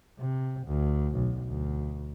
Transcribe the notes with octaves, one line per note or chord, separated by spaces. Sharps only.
C3
D2
B1
D2